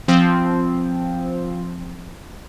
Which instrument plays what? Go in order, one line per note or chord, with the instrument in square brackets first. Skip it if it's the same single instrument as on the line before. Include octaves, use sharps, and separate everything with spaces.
[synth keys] F3 C4